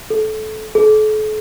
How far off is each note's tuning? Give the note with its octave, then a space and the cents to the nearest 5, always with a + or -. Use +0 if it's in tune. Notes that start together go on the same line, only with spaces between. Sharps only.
A4 -20
A4 -40